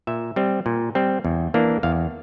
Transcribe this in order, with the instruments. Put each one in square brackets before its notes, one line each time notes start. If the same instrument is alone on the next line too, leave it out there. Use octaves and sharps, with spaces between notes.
[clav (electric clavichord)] A#2 E5
G3 C4
A#2
G3 C4
E2
E3 A#3 D4
E2 F5